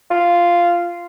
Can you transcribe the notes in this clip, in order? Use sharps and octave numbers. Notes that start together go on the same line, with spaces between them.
F4